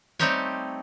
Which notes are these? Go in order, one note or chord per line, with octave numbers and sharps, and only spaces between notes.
G3 A3 C4 D#4 G4 C#5